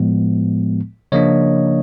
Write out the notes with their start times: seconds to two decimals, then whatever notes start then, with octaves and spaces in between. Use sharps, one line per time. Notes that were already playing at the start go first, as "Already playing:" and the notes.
Already playing: A2 F3 G#3 B3
1.12 C#3 F3 A#3 D4 C#5 D#5